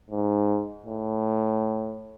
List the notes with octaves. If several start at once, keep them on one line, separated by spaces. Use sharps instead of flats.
G#2
A2